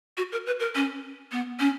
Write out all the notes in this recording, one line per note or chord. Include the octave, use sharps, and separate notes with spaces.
F#4
A#4
B4
A#4
C#4
B3
C#4